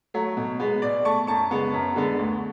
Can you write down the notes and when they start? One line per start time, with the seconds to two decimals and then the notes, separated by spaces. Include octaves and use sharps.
0.14 F#3 A3
0.37 B2
0.60 G#3 B3
0.82 B2 D5
1.05 A3 A5 C#6
1.27 F#2 A5 C#6
1.51 C#3 G#3 B3
1.74 F#2
1.96 D3 G#3 B3
2.19 D2